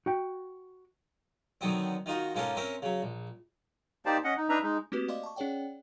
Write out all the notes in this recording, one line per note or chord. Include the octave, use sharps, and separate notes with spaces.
F#4 G5
D3 D#3 F#3 B3 C4
D#3 D#4 F4 F#4
G#2 A#3 C#4 F4 A4 A#4
C4 C#4 A#4 E5
C#3 F#3
A#1
A#3 D#4 G4 C5 D5 A5
C#4 D#5 F#5
D#4
D4 D#4 B4 E5 A#5
G#3 D#4
A3 A#3 C4 F#4 G4 B4
D5 D#5 F5 C6 D6
A5 C#6
C#4 G#4 C#5 D5 F#5 G5